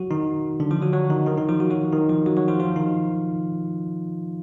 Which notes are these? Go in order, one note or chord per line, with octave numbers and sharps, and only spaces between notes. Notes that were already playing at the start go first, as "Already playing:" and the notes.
Already playing: F#3 F#4
D#3 D#4
D3 D4
F3 F4
F#3 F#4
F#3 F#4
D#3 D#4
D#3 D#4
D#3 D#4
F3 F4
F#3 F#4
F#3 F#4
D#3 D#4
F3 F4
F#3 F#4
F#3 F#4
F3 F4
F3 F4
D#3 D#4